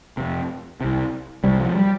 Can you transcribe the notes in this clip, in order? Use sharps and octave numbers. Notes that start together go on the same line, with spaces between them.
F2 C3
C2 C3
C2 C3 G3
F3
G3